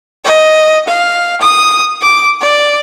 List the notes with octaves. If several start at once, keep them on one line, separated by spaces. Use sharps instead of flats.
D#5
F5
D#6
D6
D5